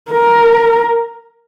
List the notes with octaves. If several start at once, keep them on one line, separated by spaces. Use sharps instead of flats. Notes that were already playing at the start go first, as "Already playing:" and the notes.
A#4